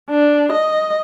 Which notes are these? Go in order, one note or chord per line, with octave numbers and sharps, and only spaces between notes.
D4
D#5